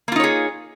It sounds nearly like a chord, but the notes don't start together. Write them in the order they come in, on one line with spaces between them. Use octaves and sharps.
A#3 F4 D#4 C#5 G#4